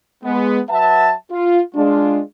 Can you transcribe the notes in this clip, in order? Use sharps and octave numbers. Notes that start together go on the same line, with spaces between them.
G#3 B3
F#3 B4 E5 F#5 A5
F4
G#3 D4 F4